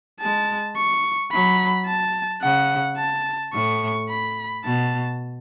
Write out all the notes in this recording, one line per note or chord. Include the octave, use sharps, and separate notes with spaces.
G#3 A5
C#6
F#3 B5
A5
C#3 F#5
A5
A2 C#6
B5
B2 A5